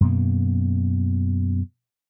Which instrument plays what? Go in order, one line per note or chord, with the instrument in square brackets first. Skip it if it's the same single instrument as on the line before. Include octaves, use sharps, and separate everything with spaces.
[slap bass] F#2 B2 A#3